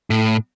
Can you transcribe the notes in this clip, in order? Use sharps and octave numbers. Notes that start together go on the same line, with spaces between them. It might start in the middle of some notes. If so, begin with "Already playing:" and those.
A2